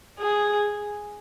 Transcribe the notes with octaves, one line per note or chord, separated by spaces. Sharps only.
G#4